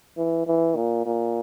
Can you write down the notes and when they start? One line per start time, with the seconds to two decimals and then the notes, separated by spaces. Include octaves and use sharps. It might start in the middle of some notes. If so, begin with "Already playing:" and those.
0.17 E3
0.47 E3
0.76 A#2
1.06 A#2